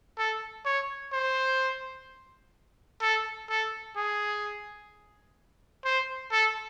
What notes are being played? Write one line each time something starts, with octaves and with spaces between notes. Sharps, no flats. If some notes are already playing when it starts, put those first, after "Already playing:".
A4
C#5
C5
A4
A4
G#4
C5
A4